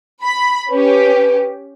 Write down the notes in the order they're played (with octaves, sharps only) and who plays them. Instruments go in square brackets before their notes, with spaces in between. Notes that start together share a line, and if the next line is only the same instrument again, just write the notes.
[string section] B5
[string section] C#4 G4 [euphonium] B4